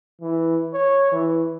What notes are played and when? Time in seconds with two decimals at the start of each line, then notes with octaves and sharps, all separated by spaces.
0.22 E3
0.74 C#5
1.13 E3